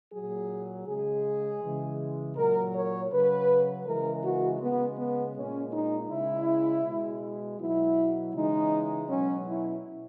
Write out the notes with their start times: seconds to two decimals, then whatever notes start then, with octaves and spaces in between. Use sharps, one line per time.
0.12 A#2 F#3 G#4
0.86 C#3 G#3 G#4
1.62 C#3 E3 G#3
2.36 A#2 F#3 A#4
2.74 C#5
3.12 C#3 F#3 B4
3.86 C#3 E3 G#3 A#4
4.23 F#4
4.61 C#3 G#3 B3
4.98 B3
5.35 A#2 G#3 C#4
5.72 D#4
6.10 C#3 G#3 E4
6.85 B2 G#3
7.59 B2 F#3 E4
8.34 C#3 E3 G#3 D#4
9.09 B2 F#3 C#4
9.47 E4